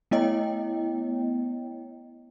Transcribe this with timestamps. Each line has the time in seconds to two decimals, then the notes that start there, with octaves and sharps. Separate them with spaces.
0.11 A3 B3 E4 C#5 D#5 G5